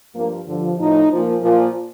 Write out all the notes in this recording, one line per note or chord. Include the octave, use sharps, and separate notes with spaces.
G2 F3 A#3
G2 D3 F3
A2 F3 D#4
A#2 F3
A#2 F3